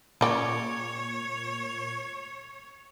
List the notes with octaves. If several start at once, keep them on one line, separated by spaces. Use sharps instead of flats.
A#2 C#3 C#5 D5 G5